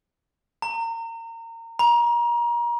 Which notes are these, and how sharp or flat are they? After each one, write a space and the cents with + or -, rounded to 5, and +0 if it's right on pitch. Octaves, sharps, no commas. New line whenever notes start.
A#5 -30
A#5 +30